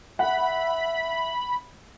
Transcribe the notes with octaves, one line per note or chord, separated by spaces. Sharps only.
E5 F#5 B5